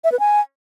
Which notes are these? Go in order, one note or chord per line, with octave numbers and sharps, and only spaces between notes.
E5
B4
G#5